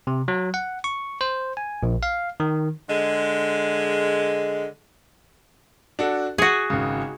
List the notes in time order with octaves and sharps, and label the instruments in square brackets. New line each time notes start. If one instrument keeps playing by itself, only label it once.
[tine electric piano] C3
F#3
F#5
C#6
C5
G#5
A#1
F5
D#3
[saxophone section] D3 G#3
[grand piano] D4 F#4 A4
[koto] F#4 G#4 [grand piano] C#7
[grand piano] G#1 C#3